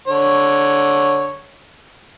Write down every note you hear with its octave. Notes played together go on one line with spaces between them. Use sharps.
D3 C#5